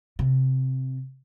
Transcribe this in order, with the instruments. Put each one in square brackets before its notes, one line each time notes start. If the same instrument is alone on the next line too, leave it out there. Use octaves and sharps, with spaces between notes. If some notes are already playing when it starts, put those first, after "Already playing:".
[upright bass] C3